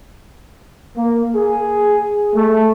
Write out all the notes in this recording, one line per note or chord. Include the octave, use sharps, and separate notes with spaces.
A#3
G#4
A3